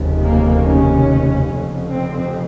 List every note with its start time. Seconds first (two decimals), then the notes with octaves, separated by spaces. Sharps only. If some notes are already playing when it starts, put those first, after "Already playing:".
Already playing: F1 D#2 C#3
0.22 A#3
0.64 C#4
1.50 F1 F2 C#3
1.92 C4